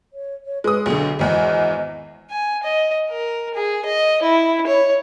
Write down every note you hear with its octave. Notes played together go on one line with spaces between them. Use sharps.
C#5
C#5
G#3 B4 D#6
B1 D3 G#4
G#1 E2 D#5
G#5
D#5
A#4
G#4
D#5
E4
C#5